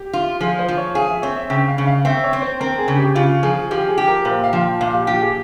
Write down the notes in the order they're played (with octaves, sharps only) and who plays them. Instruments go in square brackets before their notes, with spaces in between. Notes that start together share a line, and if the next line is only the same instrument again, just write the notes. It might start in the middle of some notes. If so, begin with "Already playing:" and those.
Already playing: [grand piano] G4
[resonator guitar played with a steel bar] F4
[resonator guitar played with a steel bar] F3 [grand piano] G#4
[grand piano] C5
[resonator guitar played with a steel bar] F3
[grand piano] C#5
[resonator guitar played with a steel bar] G#4 [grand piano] F5
[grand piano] E5
[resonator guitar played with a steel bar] C4 [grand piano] C#5
[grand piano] E5
[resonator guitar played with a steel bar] C#3 [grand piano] G5
[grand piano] F5
[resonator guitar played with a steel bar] C#3
[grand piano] F5
[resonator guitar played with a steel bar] C4 [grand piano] E5
[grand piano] C#5
[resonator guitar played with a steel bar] C4
[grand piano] C5
[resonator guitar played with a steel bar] C4 [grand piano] A#4
[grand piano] G#4
[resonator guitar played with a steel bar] C#3
[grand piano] G4
[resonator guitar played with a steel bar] C#3 [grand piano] F4
[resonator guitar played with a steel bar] F3 [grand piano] G#4
[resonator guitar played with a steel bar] F3 [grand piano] G4
[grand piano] G#4
[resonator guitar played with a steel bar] G4
[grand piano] A#4
[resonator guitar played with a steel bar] A#2 [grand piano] C5
[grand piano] F5
[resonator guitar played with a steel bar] F3
[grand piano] G5
[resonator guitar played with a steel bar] A#2 [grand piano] F5
[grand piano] G4
[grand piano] F4 [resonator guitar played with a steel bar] G4
[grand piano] G#4